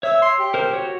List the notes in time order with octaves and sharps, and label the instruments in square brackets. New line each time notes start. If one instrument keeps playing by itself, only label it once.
[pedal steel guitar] C#5 E6 [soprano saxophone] E5
[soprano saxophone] C6
G4
[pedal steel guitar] A#4 C5
F#4 C#5 F#5